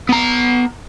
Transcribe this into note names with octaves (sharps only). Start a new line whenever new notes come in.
B3 A#5